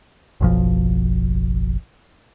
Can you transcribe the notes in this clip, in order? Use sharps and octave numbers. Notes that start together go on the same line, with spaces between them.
F#1 B1 F3